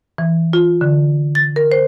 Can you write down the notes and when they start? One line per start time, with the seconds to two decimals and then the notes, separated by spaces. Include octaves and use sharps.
0.18 E3
0.53 F4
0.81 D3
1.35 A6
1.56 A#4
1.72 C5